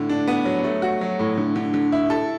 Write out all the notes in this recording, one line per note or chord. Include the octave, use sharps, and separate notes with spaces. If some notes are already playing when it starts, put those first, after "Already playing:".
Already playing: A2 D3
D4
B3
F#3
A3
F#4
F#3
A2
D3
D3
D3
E4
A4